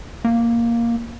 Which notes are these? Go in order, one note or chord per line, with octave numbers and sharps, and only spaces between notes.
A#3